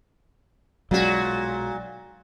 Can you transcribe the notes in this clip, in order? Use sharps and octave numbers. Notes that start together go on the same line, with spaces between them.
B1 A#2 F#3 G#3 F#4